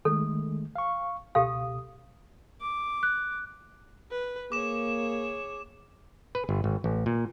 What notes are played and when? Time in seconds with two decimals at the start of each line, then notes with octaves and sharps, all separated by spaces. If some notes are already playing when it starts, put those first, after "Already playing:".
0.05 D#3 G#3 A3 A4
0.76 F5 C#6
1.35 C#2 B2 G4 A4 F5 D#6
2.61 D6
3.03 F#6
4.11 B4
4.52 A#3 G#4 C#5 D6 E7
6.35 B4
6.49 G1
6.64 G#1
6.84 A1
7.06 A#2